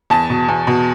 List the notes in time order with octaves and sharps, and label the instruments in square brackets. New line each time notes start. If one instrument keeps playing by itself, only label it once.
[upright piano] E2 A5
B2
E2
B2